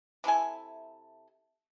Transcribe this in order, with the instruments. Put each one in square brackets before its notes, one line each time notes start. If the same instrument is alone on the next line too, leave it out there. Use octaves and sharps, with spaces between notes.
[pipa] C3 E4 A4 G#5